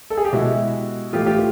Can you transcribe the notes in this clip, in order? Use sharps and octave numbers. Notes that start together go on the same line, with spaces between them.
A4
G#4
G4
B2 G#3 E4 F#4
A2 E3 A3 F4 G4
F4 G4